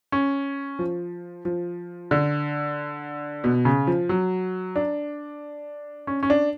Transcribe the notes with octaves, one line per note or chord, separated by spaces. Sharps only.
C#4
F3
F3
D3
B2
C#3
F3
F#3
D4
C#4
C#4
D4